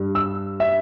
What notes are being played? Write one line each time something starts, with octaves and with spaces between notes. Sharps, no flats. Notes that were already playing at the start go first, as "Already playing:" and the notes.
Already playing: G2 G3
E6
E5